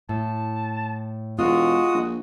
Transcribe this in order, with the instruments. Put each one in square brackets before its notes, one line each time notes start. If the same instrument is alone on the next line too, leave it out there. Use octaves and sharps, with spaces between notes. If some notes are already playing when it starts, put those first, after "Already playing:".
[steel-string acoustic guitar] A2 [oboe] A5
[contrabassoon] E1 [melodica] G#3 D#6 [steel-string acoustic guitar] F4 [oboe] F#4
[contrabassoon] A#1